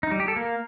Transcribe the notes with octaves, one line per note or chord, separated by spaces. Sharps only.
D#4
G3
G4
A4
A#3